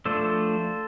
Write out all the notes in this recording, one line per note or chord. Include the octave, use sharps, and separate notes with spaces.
F3 A3 D4 A4 C5